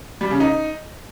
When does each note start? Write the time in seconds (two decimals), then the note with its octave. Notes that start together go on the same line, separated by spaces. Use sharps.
0.21 G3
0.31 C#3
0.40 D#4